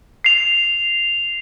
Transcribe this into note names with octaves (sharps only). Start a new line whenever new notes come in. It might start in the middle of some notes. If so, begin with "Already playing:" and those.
C7 F7